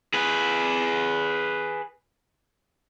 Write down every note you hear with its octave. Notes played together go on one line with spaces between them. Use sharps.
G#4 B4